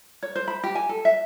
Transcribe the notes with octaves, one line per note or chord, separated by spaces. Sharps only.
C#5
C5
B5
G4
G#5
A4
E5